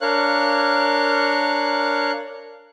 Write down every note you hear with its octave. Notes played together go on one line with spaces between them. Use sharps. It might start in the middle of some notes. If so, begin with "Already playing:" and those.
D4 A#4 C#5 F5 F#6